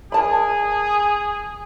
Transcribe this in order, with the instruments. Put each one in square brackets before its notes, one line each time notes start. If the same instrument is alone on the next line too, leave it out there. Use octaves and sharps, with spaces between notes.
[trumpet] G#4 [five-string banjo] A#4 A5 B5